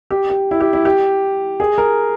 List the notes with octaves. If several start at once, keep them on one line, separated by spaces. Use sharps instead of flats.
G4
G4
E4
G4
E4
G4
G#4
A#4